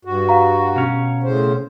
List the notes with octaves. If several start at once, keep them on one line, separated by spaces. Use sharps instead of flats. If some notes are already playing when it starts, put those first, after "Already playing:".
G2 F#4
F5 A#5
B2 C#4
A2 C#3 C5